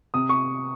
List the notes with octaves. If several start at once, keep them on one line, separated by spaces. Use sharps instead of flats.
C3 D#6
C#6